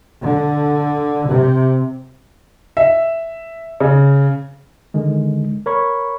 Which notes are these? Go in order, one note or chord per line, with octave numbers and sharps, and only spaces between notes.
D3
C3
E5
C#3
D3 D#3 G#3
A#4 C#5 B5 C#6